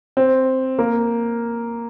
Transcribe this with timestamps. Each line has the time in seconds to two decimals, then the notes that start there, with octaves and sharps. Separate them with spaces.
0.17 C4
0.79 A#3